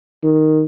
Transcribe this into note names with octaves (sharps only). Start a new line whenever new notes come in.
D#3